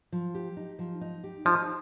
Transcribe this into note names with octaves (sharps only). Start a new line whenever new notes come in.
F3
G4
D#4
F3
D#4
G4
F3 D#4